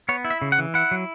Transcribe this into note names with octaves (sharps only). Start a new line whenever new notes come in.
B3 C#5
E4
E5
C#3
F#5
E3
E4 F#5
F#3